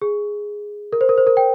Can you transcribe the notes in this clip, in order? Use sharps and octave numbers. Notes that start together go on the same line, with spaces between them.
G#4
A#4
C5
A#4
C5
A#4
G5